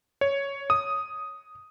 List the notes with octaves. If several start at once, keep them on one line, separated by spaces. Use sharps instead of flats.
C#5
D#6